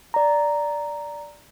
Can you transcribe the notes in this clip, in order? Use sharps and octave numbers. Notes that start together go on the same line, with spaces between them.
D5 A#5